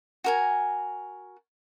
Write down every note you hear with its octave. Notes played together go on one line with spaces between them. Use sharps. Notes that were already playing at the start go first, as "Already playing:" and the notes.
F#4 A#4 G#5